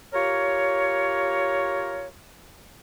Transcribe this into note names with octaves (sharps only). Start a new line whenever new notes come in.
F4 G4 A#4 C#5